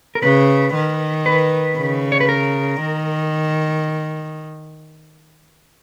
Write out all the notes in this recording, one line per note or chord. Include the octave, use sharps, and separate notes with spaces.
A#4
C#3 B4
D#3
B4
C#3
C#5
B4
A#4
D#3